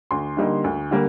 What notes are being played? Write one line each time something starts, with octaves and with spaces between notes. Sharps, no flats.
D2 C6
D3 G3 A#3 D#4
D2
D3 G3 A#3